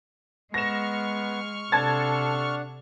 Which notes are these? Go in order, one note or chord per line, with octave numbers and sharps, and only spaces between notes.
G#3 B3 F#5 C#6 F6 A#6 E7
C3 D4 A4 F#5 A5 G#6 A6